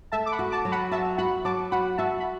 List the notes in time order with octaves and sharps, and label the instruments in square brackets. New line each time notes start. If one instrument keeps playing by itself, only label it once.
[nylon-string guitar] A3 [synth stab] E5 A5
[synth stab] D6
F#5 B5
[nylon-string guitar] F#4
[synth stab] A5 D6
[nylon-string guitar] F#3
[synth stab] F#5 B5
[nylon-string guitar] F#4 [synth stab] E5 A5
[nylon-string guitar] F#4 [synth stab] F#5 B5
[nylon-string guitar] F#3 [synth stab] A5 D6
[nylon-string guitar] F#4 [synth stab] F#5 B5
[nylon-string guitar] F#4 [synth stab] E5 A5
[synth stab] B5